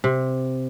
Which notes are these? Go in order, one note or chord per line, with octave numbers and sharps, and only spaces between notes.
C3